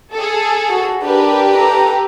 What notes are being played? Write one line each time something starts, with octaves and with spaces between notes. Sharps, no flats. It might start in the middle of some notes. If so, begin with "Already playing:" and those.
G#4 A4
F#4
D4 G4 A#4 B4
A4 A#5